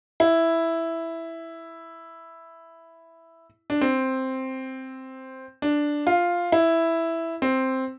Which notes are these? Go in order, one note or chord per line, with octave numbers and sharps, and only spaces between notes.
E4
D4
C4
D4
F4
E4
C4